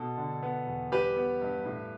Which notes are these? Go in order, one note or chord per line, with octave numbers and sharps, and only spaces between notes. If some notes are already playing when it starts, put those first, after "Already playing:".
Already playing: B2 A4
D3
B3
E2
G3 G4 B4
B3
G2
A2